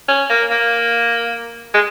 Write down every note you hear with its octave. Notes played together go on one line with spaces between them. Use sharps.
C#4
A#3
A#3
G#3